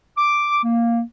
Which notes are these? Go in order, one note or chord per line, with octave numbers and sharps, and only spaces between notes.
D6
A#3